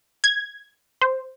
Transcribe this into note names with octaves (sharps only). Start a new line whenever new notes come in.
G#6
C5